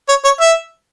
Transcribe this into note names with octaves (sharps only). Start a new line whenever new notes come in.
C#5
C#5
E5